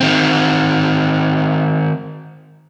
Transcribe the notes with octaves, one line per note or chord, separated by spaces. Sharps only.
D#3 C4